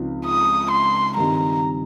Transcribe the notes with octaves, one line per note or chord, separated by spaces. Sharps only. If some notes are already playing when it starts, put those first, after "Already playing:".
Already playing: C#2 C#3 F3 C4 D#4
D#6
C6
G2 D#3 G3 C4 D#4 A#5